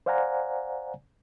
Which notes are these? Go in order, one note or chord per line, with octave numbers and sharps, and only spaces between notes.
C5 D5 F5 F#5 G#5 A#5